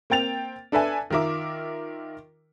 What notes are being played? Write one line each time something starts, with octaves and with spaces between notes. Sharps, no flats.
A#3 C4 G5 A6 F7
D4 A4 B4 E5 G#5
D#3 F4 A#4 E5 D6